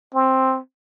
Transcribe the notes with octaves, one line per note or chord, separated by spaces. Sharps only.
C4